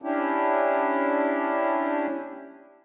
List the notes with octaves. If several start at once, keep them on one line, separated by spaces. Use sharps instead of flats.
C#4 D4 E4 G4